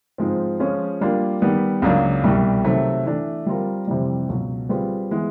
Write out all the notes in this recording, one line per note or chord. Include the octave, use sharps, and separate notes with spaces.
G#2 F3 G#3 C4 F4
F3 G#3 C#4 F4
G3 A#3 D4 F4
D#3 G3 B3
C#2 C#3 F#3 A#3 D4
C2 B2 G3
C3 D#3 F#3 A3
E3 A3 D4
G3 C4 F4 A#4
F2 C3 E3 G3
C#2 B2 F#3
G3 C4 F4 G#4 B4
E3 G#3 B3